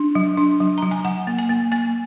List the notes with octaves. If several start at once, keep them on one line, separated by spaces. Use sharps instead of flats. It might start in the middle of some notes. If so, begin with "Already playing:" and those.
Already playing: D4
F#3
D4
F#3
F#3 A#5
G#5
F#3 F#5
A#3
G#5
A#3
A#3 G#5